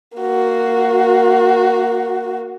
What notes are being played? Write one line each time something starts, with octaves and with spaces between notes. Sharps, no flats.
A#3 F#4